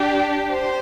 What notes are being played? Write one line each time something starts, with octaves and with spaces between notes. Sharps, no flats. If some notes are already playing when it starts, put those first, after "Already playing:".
Already playing: D4 G4
C5